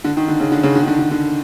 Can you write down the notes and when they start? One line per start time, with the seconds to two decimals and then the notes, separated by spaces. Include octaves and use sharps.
0.04 D3
0.17 D#3
0.28 D3
0.40 C#3
0.52 D3
0.63 C#3
0.75 D3
0.83 D#3
0.87 D3
0.99 D3
1.11 D3